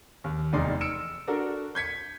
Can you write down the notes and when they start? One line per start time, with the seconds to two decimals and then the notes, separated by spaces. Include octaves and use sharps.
0.24 D#2
0.53 F1 E2 D#4 D5 C6
0.81 E6 C#7 D7 E7
1.28 D4 F#4 A4 A#4
1.75 G6 G#6 B6 C#7